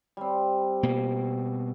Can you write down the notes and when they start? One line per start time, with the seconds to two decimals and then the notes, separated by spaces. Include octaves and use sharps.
0.17 G3 C4
0.83 B2 A#3